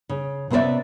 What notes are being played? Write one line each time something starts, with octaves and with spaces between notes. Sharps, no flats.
C#3
C3 B3 C#4 C5 D5 E5